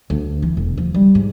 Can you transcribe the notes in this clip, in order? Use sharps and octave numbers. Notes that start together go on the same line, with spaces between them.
D2
E3
E1
F3
G3
G#2